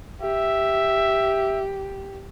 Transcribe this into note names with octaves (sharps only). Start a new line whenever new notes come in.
G4 E5